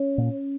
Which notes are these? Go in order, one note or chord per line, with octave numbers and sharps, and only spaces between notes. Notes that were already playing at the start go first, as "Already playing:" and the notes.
Already playing: C#4
A#2